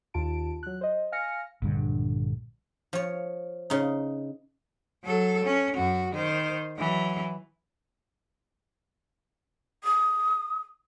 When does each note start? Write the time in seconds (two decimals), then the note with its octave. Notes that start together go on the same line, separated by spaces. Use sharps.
0.14 D#2 F4 A5 D7
0.63 F#3 F#6
0.81 C5 D#5
1.12 F5 G#5 F6 A#6 C#7
1.62 A#1 G2 D3
2.93 F3 C#5
3.70 C#3 D#4
5.04 F#3 A4
5.45 C#4
5.75 F#2 F#4
6.13 D#3 C5
6.78 E3 F#3
9.84 D#6